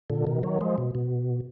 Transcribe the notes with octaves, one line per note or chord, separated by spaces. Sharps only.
A#2 D3
B2 D#3
D#3 F#3
F3 G#3
B2
B2